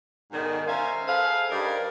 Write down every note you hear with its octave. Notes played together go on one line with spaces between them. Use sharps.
G#2 B2 D3 D#3
C#4 A#4 C5 E5 F5 G#5
G#4 A4 B4 C5 F5
G2 G3 D#4 A#4 D5